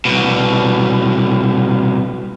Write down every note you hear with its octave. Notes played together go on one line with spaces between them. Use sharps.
C2 B2